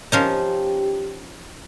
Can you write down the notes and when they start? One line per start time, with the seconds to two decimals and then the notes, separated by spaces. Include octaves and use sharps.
0.12 F3 C#4 D#4 G4